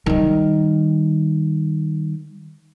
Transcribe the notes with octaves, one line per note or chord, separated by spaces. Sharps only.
D#3 G3